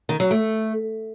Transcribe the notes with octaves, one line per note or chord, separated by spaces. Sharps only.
D#3
F#3
A3